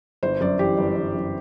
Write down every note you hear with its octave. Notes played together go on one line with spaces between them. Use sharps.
G1 C5
F#2 D5
E3 G4
G1
G1
F#2